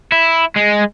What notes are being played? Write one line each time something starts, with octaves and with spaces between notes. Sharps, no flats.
E4
G#3